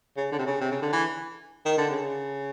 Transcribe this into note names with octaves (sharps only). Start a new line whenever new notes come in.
C#3
D3
C3
C#3
C3
C#3
D3
E3
D#3
D3
C#3